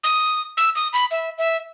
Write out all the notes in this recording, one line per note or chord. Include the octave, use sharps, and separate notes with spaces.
D#6
E6
D#6
B5
E5
E5